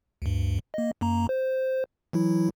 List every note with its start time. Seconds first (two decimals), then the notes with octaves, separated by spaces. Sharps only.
0.22 D2 G2
0.74 A#3 D#5
1.01 F#2 A#3 A#5
1.29 C5
2.13 E3 F#3 E4